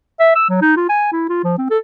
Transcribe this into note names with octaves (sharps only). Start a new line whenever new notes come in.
E5
E6
F#3
D#4
F4
G#5
E4
F4
F3
C4
A4